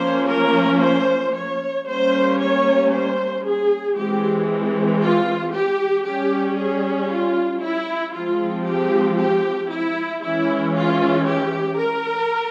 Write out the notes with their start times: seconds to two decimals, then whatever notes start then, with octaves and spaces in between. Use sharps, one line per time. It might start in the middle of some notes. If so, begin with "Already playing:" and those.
Already playing: F3 A#3 C#4 C5
0.30 A#4
0.83 C5
1.35 C#5
1.87 G3 A#3 C#4 C5
2.40 C#5
2.92 C5
3.44 G#4
3.96 E3 G#3 C4 G4
5.01 F4
5.53 G4
6.05 G3 C#4 G4
6.57 G#4
7.10 F4
7.62 E4
8.14 F3 G#3 C4 F4
8.67 G4
9.19 G4
9.71 E4
10.23 E3 G#3 C#4 E4
10.76 F4
11.28 G4
11.80 A#4